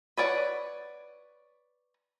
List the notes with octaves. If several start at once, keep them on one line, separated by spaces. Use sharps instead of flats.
B4 C#5 D5 F#5